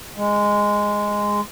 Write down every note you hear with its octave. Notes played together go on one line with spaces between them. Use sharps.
G#3